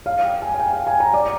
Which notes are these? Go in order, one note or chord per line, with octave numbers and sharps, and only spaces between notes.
F5
G5
G#5
G#5
G5
F5
G#5
A#5
D5